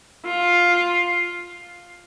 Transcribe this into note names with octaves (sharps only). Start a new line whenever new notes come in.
F4